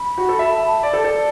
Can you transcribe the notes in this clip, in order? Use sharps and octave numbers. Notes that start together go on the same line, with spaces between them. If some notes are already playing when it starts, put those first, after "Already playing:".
Already playing: B5
F#4
A4
E5
A5
B5
A5
D5
A4
A4 D5